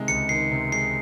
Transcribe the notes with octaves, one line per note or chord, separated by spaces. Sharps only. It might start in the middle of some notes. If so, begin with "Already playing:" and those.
Already playing: C3 D#3 G#3
C#2 C#7
D#3 C7
C3
G#3 C7